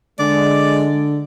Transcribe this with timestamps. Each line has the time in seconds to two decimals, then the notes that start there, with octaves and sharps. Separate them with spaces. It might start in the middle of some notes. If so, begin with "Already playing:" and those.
0.19 D3 G#3 D5